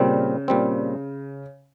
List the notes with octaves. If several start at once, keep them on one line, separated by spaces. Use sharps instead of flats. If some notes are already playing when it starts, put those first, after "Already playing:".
Already playing: A#2 C#3 G3 C4
A#2 G3 C4